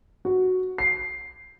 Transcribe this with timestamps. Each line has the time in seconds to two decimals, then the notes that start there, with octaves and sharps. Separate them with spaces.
0.25 F#4
0.78 C7